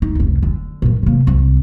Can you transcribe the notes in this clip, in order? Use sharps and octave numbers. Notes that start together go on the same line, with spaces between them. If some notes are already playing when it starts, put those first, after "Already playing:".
D#4
F1 C#2
D3
G2 A#2
C3 A#3
C2